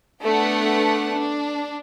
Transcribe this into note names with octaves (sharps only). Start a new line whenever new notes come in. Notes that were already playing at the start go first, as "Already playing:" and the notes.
A3 B3 D4 F#5
D4